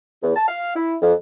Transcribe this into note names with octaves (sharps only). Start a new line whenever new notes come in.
E2
A5
F5
E4
F2